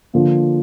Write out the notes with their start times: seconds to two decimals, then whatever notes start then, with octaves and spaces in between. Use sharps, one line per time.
0.14 D3 F3 A#3